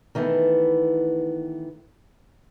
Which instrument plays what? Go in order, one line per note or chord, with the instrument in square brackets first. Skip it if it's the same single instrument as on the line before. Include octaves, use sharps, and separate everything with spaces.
[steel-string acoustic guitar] D#3 E3 A3 B3